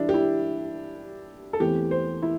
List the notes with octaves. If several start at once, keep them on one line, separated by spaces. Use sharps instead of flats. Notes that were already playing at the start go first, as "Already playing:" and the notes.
Already playing: E3 G3 D4 E4
G4
E4
A4
E2 E3 A3 C4 G4
C5
E4